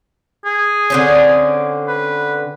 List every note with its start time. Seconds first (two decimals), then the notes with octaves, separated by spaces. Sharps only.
0.45 G#4
0.90 D3 C4 C#4
1.88 B4